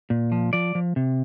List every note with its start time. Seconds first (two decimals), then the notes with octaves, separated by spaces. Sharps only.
0.10 A#2
0.32 F3
0.53 F3 D5
0.75 F3
0.96 C3